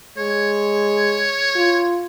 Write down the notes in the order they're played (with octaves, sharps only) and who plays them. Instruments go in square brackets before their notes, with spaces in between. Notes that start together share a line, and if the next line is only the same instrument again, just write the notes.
[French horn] G#3 [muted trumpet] C#5
[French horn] F4